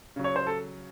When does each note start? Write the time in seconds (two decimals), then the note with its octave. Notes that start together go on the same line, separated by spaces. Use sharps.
0.16 C#3 F#3
0.24 C#5
0.36 C5
0.47 A4